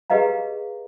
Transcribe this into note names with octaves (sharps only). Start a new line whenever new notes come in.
G4 G#4 B4 D#5 F5 A#5